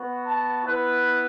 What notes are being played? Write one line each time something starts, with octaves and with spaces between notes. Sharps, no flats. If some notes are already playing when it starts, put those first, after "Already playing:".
Already playing: B3 F#4
A5
B3 E4 B4